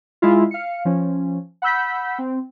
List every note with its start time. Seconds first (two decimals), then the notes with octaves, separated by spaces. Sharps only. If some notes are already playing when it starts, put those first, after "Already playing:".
0.22 G#3 E4 F4
0.51 F5 C#7
0.85 F3 C#4
1.62 F#5 B5 E6 G6 B6
2.19 C4